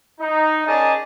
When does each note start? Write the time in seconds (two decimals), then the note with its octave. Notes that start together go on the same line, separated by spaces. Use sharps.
0.20 D#4
0.67 C#4 G#4 A#4 D5 D#5 A5